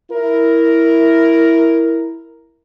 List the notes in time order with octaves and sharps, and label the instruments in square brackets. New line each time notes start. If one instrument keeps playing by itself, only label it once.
[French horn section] E4 A#4